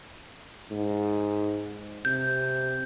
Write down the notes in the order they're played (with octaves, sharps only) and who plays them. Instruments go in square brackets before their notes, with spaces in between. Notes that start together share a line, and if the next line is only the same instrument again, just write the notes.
[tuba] G#2
[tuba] C3 [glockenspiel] G6